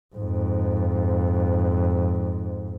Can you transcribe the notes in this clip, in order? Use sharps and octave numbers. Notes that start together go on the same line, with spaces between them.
F2 G#2